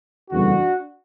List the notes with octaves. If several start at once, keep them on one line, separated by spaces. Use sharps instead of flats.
F#1 E2 D3 G3 D4 F#4